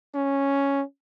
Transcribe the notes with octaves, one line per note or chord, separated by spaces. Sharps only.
C#4